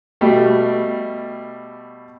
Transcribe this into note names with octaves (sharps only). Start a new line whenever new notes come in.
B2 G3 A3